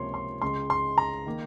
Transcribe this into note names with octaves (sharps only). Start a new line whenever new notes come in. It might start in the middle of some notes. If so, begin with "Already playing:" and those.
Already playing: C#2 C3 F3 A#3 C#4 C#5 C6
C6
C#2 C#3 G#3 C#4 C6
C6
A#5
D#3 A#3